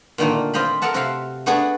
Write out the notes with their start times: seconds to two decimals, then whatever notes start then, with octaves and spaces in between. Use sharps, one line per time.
0.18 A#2 D3 D#3 A3 A#3
0.53 C4 F4 D#5 F5 G5 B5
0.82 A4 A#4 D#5 F#5 A5
0.94 C3 F#4 A4 E5 F5
1.46 A3 B3 D4 F#4 G#4 D5